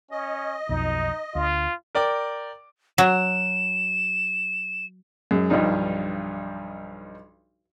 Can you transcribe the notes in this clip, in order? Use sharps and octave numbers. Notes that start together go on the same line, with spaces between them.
C#4 D#5
B1 F2 D#4
D2 F4
A#4 D5 G5 D6
F#3 E7
F#2 G#3
B1 G2 F3 D4 D#4